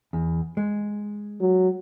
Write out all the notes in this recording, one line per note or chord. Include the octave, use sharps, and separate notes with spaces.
E2
G#3
F#3